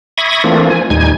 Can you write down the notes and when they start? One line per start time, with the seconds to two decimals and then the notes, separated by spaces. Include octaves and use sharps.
0.18 E5 B5 C#6 D#6 G#6 A#6
0.44 E3 A3 A#3 C4 D4 F4
0.70 F3 G#5
0.90 D#2 A2 G3 D#4 G#5 G#6